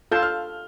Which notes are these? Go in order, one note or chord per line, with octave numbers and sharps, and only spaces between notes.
F4 A4 F5 A5 G6
F6